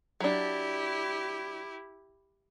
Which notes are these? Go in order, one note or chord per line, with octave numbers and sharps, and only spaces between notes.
F#3 D4 E4 G4